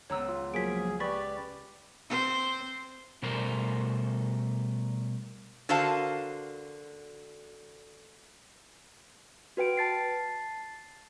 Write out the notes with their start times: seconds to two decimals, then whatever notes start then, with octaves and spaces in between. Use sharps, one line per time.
0.10 C#2 B3 C#5 A#5 E6
0.29 F4
0.54 F3 F#3 A#3 G#4 B6 D7
1.00 G4 B4 D5 B5 C#6 A6 B6
2.10 C4 C5
3.22 B2 G3 A3 A#4 C5
5.69 D3 F#4 A#4 C5 F5 A5
9.57 F#4 B4 G5 D7
9.77 A5 A6 C7